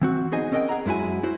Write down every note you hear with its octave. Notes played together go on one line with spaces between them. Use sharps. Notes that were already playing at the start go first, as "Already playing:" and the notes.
E3 C4 F#4
B3 D#4 G#4 C5 D#5 G#5
C4 C#4 A#4 D#5 F#5 G5
G#4 F#5 A#5
F#2 G#3 E4 F#4 G#5
E4 F#4 C5